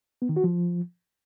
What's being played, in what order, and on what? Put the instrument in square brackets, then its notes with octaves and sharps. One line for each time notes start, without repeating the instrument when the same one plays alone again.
[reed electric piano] B3
D#3
F#4
F3